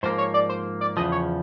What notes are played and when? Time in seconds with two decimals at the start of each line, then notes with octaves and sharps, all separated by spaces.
0.03 G#2 F3 A#3 C5
0.18 C#5
0.34 D5
0.49 C5
0.81 D5
0.97 E2 C#3 F3 D#5
1.12 C#5